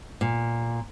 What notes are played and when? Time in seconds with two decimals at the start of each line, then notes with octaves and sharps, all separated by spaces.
0.21 A#2